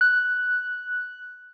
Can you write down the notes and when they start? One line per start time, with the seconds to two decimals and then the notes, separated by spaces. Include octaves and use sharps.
0.01 F#6